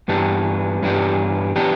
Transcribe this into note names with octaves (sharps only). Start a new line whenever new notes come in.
G2 E3 B3 D4 G4
G2 E3 B3 D4 G4
E3 B3 D4 G4